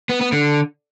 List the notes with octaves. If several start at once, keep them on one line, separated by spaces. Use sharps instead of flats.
B3
B3
D3